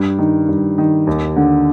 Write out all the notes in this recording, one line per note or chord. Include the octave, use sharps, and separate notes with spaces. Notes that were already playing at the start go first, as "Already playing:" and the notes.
Already playing: G2
D#3
G2
D#3
D#2
D3